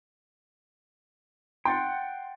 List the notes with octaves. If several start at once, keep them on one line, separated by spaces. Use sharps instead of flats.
F#5 G5 C6 A6